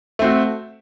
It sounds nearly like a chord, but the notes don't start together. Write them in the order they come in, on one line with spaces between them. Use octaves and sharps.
A3 C4 F#4